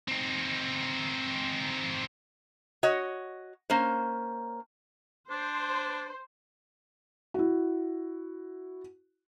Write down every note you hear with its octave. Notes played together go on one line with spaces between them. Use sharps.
C4 D#4
F#4 C#5 D#5
A#3 C#4 C5
D4 C5
E4 F#4